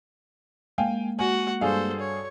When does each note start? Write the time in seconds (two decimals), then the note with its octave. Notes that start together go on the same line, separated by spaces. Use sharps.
0.78 G#3 A#3 F5 G5 G#5
1.19 F#4 F#5 G#5
1.61 G2 G#4 A4 C5 F5
2.00 C#5